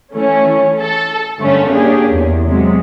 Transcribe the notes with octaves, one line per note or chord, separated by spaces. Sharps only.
E3 A3 C#4
A4
G2 D3 A3 A#3 C#4
A#3 C#4 D4 G4 G#4
E2
C3 F#3 G#3